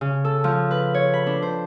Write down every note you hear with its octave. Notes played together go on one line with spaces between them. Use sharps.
C#3
A4
F3
B4
C#5
B5
D4
C5